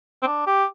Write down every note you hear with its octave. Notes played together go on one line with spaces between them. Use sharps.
C4
D4
G4